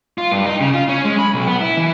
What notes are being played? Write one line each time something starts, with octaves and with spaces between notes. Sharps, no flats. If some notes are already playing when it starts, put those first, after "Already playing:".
F4
G2
D#4
C#3
F4
C#4
G#3
B5
B1
B3
E4
E3